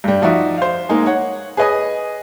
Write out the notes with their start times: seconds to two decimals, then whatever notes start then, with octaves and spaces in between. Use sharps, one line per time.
0.04 G2 G3
0.22 F3 D#4 F#4 D5 E5
0.58 C5 F5
0.89 G#3 A#3 D#4 G#4
1.06 C#5 F#5
1.57 G#4 B4 C#5 D#5 G#5 D#6